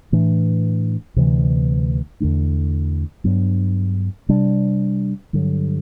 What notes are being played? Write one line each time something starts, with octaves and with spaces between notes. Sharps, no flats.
A2 E3 A3 D4
D2 C3 E3
E2 D3 A3 D4
G2 F#3 B3 D4
C3 G3 D4
G2 D3 F#3